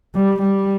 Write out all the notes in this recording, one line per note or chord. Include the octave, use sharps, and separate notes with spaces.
G3
G3